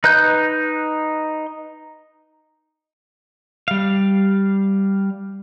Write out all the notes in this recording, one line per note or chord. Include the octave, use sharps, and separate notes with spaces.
D#4 B4 F#6 G6
G3 F5